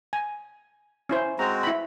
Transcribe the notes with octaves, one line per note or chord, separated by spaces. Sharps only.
G#5
C#4 E4 C5
G#3 C4 F#4 A#5
E4 B5